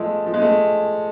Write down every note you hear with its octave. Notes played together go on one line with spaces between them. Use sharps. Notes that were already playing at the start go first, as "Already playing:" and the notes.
Already playing: F3 G#3 A3
F3
G#3
A3